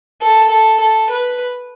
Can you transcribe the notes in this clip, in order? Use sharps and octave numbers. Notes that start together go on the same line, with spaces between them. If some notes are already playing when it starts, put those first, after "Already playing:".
A4
A4
A4
B4